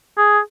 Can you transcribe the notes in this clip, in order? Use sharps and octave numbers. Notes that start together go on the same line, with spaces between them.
G#4